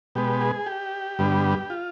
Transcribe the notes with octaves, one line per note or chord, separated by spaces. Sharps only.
B2 G#3 B3 G4
G#4
G4
G2 D3 G3 B3
F4